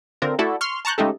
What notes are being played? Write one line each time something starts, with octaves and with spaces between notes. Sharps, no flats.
D3 C4 D4 F4 A#4
A3 E4 F#4 A4 D5 F#5
C6 C#6 F6
A5 A#5 C#6 F#6 G6
C#3 G#3 A3 D#4 G4 A4